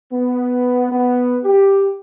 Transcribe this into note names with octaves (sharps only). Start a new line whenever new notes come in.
B3
B3
G4